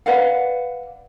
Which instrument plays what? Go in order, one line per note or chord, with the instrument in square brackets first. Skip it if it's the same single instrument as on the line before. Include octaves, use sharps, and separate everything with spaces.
[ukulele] B4 D5 F5 F#5